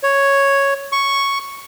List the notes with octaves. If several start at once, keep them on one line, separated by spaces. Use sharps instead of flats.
C#5
C#6